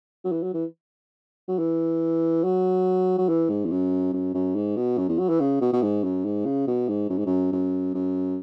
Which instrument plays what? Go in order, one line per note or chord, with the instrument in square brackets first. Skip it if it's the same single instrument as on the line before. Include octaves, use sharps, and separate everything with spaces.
[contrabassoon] F#3
E3
F#3
E3
F#3
E3
F#3
F#3
E3
G#2
E2
F#2
F#2
F#2
G#2
B2
F#2
E2
F#3
E3
C#3
B2
B2
G#2
F#2
G#2
C#3
B2
G#2
F#2
G#2
F#2
F#2
F#2